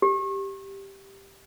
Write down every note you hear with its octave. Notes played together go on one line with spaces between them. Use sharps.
G4